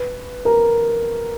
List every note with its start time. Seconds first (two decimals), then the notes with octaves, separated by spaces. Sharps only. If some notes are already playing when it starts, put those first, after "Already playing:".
Already playing: B4
0.45 A#4